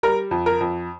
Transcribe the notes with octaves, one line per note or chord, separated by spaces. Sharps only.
G3 A#4
F2
A#4
F2